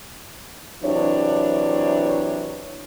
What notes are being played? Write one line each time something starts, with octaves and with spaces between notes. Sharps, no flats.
C3 E3 F#3 D4 C#5